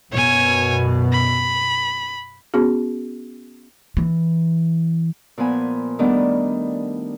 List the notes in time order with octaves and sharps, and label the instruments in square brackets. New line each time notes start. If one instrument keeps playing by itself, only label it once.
[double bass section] F#2 B2 [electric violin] C#5 G#5
[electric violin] B5
[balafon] B3 C#4 F#4 G#4
[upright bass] E3
[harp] A#2 F3 B3 G#5 B5
D#3 G3 A3 B3 D4